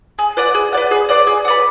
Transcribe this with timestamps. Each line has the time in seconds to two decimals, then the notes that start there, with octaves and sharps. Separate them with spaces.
0.19 G#4
0.37 B4 D5 F#5
0.55 G#4
0.73 B4 D5 F#5
0.91 G#4
1.09 B4 D5 F#5
1.27 G#4
1.45 F#5
1.48 B4 D5